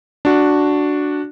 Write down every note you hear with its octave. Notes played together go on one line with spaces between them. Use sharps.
D4 F#4